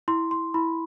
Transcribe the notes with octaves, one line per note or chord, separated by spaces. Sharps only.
E4 C6
C6
E4 B5